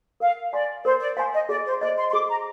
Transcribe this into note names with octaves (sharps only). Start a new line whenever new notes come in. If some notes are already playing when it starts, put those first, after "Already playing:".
A#4 F5
D5 F5 G#5 C6
A#4 C5
D5
C5 F5 G#5 C6
D#5
G#4 D5
C5
C5 D5 D#5
C6
C6
G#4 D6
A#5